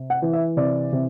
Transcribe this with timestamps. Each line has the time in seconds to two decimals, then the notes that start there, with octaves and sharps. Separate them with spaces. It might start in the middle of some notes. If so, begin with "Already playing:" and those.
Already playing: C3
0.10 F#5
0.22 E3
0.33 E5
0.57 C3 D5
0.92 C3